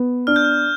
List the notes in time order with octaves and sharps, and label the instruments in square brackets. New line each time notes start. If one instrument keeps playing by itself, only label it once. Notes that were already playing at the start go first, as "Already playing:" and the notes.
Already playing: [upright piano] B3
[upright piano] D4 [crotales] F6
[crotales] G6
F6